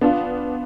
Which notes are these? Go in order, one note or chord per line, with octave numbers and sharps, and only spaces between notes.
B3 D4 F4